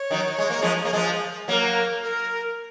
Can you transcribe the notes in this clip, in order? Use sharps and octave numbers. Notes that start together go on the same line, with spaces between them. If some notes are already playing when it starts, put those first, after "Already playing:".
Already playing: C#5
D#3 F#3
G#3
A#3
F3 G#3
A#3
F3 G#3
F#3 A#3 A#4
A#4